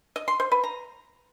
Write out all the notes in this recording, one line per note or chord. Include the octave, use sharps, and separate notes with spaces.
D#5
C6
C5
B4
A#5